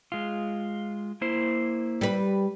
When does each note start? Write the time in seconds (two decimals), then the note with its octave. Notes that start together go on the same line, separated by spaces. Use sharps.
0.12 G#3 F4
1.21 A#3 E4 C5
2.01 G3 B4